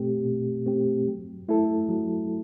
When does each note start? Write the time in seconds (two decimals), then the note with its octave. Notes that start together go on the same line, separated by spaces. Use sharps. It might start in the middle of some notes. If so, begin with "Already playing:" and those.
Already playing: B2 A3 C4 G4
0.26 B2
0.66 A3 C4 G4
1.07 F#3
1.48 A3 E4 A4
1.89 F#3